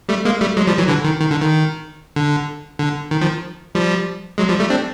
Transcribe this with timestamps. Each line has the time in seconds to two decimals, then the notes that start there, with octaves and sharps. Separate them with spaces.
0.09 G3 A3
0.25 G#3 A#3
0.41 G3 A3
0.57 F#3 G#3
0.67 F3 G3
0.78 E3 F#3
0.89 D3 E3
1.05 D#3
1.20 D#3
1.31 D3
1.41 D#3
2.16 D3
2.79 D3
3.11 D#3
3.22 D#3 F3
3.75 F3 G3
4.38 F#3 G#3
4.49 F3 G3
4.60 G3 A3
4.70 C4 D4